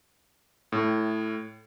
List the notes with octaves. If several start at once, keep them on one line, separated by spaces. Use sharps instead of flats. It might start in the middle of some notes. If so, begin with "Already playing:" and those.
A2